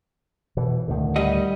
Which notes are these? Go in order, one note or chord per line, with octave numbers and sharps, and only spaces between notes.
B2 E3
D2 A2 D#3
G3 D#5 F#5